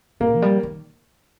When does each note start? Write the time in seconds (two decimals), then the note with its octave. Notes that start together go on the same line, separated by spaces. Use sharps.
0.20 G#2 A#3
0.35 F3
0.42 G3
0.63 D#3